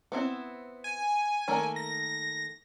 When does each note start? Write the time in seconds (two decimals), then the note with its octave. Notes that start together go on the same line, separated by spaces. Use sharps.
0.12 B3 C4 E4
0.84 G#5
1.48 D#3 A3 A#3
1.76 A#6